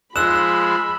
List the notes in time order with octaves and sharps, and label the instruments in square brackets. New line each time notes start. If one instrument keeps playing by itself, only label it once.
[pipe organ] F3 G#3 [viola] B5 [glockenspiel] E6 E7 [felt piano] F#6